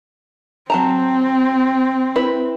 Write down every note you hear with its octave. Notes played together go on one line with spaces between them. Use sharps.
F#3 C4 A5 A#5
E4 B4